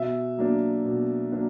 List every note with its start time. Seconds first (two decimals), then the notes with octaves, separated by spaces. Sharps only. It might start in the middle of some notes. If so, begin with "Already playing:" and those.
Already playing: B2 E5
0.37 F#3 A#3 D4
0.85 B2
1.32 F#3 A#3 D4